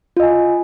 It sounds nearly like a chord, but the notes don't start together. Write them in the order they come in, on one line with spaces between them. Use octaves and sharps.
F4 D#5 G#5